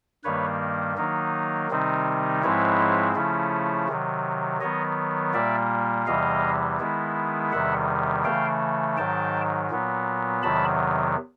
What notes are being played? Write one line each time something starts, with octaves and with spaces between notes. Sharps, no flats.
G2 D#3 G3 A#3 B4 C#5
D#3 F#3 A#3 D#4
C3 D#3 G3 C4 D#4
G#2 F3 G#3 C4 E4 B4 C#5
C#3 F3 A3 C#4 E4
C3 D#3 F#3
D#3 F#3 B3 C#5 D#5
A#2 G3 A#3 D5 E5
E2 C3 E3 G3 D#5 F5
D#3 G#3 B3 E4
E2 C3 D#3 G3 E5 F#5
C#3 E3 A3 F5 G5
G#2 D#3 F#3 G5 A5
A#2 F#3 B3
E2 C3 D#3 F#3 A5 B5